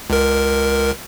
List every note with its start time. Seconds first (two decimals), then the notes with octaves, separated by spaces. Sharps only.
0.10 C#2 A#4